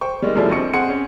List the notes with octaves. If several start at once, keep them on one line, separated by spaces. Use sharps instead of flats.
C5 G5 C#6
G3 G#3 A#3 D#4
F#2 C#3 F3 G3 A3 E4
A#1 C4 D#5 C#6 C#7
C4 G#4 F#5 C6 C#7
C#4